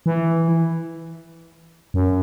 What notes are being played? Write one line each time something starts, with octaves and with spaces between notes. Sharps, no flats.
E3
F#2